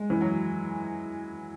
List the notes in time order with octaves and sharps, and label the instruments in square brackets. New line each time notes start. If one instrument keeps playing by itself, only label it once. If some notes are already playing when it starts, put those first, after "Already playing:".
Already playing: [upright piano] G#3
E3
F#3